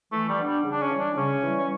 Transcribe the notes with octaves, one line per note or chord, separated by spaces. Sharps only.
E3 A3
G3
B3 D4
G3
C#3
D4
C#4
E3 G3
D4
C#3 C#4
E3 G3
C#4